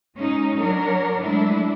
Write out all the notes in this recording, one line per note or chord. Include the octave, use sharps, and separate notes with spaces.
G#3 C#4 D#4
F#3 D4 A#4 C#5
F#3 G#3 A3 D4 E4